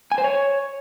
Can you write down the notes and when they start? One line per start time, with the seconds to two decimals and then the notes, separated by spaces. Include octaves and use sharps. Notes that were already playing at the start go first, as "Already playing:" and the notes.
0.12 G#5
0.18 C5
0.24 C#5